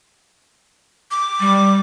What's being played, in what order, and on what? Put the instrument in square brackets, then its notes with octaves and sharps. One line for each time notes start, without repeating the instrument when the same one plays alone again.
[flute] D6
[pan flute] G3